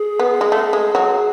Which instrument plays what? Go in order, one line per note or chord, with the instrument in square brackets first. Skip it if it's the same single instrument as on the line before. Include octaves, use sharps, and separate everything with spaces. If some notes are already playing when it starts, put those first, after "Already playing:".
Already playing: [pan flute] G#4
[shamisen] B3
G#3
A3
G#3
F#3